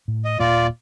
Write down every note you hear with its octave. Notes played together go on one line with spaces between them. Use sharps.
A2
D#5
D#1 A#2 A#3 F4 D5